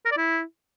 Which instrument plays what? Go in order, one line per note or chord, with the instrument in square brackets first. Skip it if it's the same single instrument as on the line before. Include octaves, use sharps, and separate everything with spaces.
[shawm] A#4
D5
E4